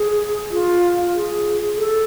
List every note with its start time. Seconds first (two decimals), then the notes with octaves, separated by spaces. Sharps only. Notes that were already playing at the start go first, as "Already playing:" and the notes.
Already playing: G#4
0.51 F4
1.14 G#4
1.77 A4